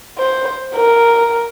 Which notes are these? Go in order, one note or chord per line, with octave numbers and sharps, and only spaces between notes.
C5
A#4